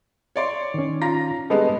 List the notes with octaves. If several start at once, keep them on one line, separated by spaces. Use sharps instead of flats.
C#5 D5 C6
D#3 C#4
F4 A#5 A#6
G3 G#3 B3 A4 B4 D#5